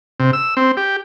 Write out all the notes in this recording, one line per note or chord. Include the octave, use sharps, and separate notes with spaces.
C3
E6
C4
G4